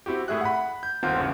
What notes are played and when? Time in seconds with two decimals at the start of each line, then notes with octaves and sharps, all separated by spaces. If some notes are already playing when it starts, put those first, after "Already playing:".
0.06 C4 E4 F#4 G4
0.28 A2 A3 G#4 E5 F#6
0.41 F#5 B5
0.83 G6
1.03 G1 D#2 C4 F4 F#5 G6
1.17 G#1 E2 C#3